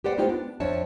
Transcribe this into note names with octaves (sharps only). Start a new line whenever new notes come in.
G4 B4 C5 D5 F#5
A3 B3 C4 D#4 F4 G4
B3 D4
F2 D4 C#5 E5 A5